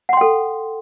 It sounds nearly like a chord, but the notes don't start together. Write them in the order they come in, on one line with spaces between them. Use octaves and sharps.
F#5 C6 G5 A4